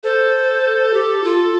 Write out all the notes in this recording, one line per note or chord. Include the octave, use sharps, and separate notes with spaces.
A4 C5
G4
F4